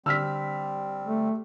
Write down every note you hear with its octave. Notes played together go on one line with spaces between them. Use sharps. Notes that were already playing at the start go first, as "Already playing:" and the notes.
D3 G3 C4 E6 F6 B6
A3